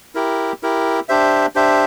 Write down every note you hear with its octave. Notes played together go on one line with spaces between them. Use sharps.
E4 G4 A#4
E4 G4 A#4
D4 G4 C5 E5
D4 G4 C5 E5